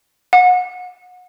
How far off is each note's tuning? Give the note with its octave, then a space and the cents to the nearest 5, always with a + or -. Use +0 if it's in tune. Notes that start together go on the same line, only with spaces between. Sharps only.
F#5 -30